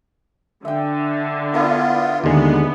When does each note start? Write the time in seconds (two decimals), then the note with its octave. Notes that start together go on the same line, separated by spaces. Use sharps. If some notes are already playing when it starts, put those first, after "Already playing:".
0.65 D3 E5 G5
1.54 B3 D4 E4 F4 A#4
2.24 D#2 D3 G#3 B3